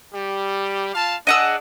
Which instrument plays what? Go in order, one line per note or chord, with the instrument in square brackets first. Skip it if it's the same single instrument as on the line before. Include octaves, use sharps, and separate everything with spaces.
[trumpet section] G3 G4
F4 F5 A5
[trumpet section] D4 G#4 [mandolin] D#5 F#5 E6